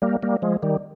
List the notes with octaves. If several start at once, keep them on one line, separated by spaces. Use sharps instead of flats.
G3 A#3
G3 A#3
F3 G#3
D#3 G3